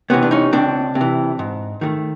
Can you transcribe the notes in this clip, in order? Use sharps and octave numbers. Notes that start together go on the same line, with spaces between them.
C3 E3 B3 C#4
D4
C#4 D#4
C#2 C4 D4
C3
E3
G#2
D#3 F#3 A3